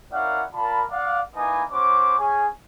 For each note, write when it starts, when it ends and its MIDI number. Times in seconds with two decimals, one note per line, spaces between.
0.13 0.43 61
0.13 0.43 64
0.13 0.43 70
0.13 0.43 74
0.13 0.43 77
0.13 0.43 78
0.55 0.83 65
0.55 0.83 70
0.55 0.83 74
0.55 0.83 81
0.55 0.83 83
0.91 1.20 74
0.91 1.20 77
0.91 1.20 78
1.35 1.63 58
1.35 1.63 63
1.35 1.63 64
1.35 1.63 71
1.35 1.63 75
1.35 1.63 80
1.72 2.18 61
1.72 2.18 66
1.72 2.18 72
1.72 2.18 86
2.19 2.48 61
2.19 2.48 68
2.19 2.48 80